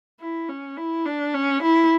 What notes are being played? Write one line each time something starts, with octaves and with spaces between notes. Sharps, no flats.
E4
C#4
E4
D4
C#4
E4